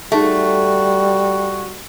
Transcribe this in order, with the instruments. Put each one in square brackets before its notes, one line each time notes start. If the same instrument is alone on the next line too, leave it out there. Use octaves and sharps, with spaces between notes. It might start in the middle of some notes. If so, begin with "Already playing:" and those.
[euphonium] G3 [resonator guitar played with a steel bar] A3 [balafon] D#4 G#4 A5 [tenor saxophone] F#4